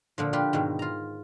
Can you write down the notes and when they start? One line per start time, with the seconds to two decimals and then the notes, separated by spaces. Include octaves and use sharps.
0.18 A#2 D3 F3
0.33 F3 F4 G4 B4
0.53 G#2 B2 D#3
0.79 F4 A#5